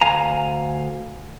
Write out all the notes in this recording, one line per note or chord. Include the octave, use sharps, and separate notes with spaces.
D2 F5 G#5 A#5